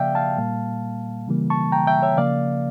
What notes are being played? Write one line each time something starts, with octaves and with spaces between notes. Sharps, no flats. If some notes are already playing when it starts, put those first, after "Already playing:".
Already playing: C#3 F3 A#3 D5 E5 F5 G5
F5 A5
A#2 G3 A#3
C#3 E3 G3 A#3
A5 C#6
G5 A#5
E5 G5
C#5 E5
C#3 F3 A#3 D5 F5